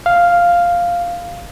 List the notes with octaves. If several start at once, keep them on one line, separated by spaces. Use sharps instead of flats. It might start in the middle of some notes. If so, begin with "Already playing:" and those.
F5